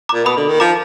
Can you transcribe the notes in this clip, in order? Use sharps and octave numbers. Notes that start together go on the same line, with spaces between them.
A#2 A#5 D6
B2 B5 D#6
D3
D#3
F3 A#5 D6